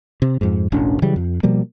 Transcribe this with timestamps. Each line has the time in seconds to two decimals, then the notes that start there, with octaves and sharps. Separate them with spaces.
0.22 C3
0.41 F2 G#2
0.72 E1 A1 C#4 D4
1.02 C#3 E3 F#3 G3
1.16 F2
1.43 B2 F3 G3 A#3